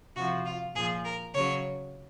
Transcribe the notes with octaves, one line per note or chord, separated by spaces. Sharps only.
C3 F3 F#4
F4
A#2 F3 G#4
A#4
C#3 F#3 C#5